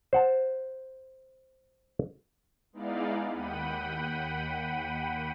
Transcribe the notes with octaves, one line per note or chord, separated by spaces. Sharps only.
C5 F#5 A5
G#3 B3 D#4 E4 D5 F5
D#2 F#5 G5 B5 D#7